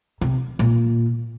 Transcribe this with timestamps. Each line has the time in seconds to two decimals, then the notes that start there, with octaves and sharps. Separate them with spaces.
0.21 C3
0.59 A#2